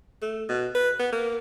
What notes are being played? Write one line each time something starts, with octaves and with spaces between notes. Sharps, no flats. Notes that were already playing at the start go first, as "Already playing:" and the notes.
A3
B2
B4
B3
A#3